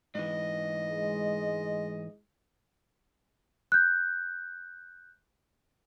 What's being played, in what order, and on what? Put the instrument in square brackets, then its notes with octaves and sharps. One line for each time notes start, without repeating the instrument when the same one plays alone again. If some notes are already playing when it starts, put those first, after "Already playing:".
[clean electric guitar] G#2 E3 [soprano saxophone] D#5
[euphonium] G#3
[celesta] F#6 G6